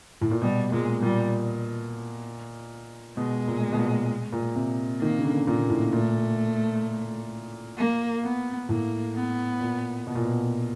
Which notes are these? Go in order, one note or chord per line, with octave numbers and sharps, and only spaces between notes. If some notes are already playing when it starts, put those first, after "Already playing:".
A2
A#2
B2 G3
A#2 G#3
A#2 G3
B2 G#3
A#2
B2
A#2
A#2
C3
D#3 A#3
C#3
D3
A#2 A#3
A2
A#2 A3
A#3
B3
A2 A#3
B3
A#2
B2
A#2
B2